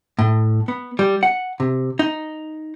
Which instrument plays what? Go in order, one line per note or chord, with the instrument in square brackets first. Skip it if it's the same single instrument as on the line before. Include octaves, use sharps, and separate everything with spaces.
[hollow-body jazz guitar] A2
B3
G3
F#5
C3
D#4